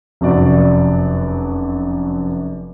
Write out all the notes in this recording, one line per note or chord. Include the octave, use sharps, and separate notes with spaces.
F1 F#2 F#4 D5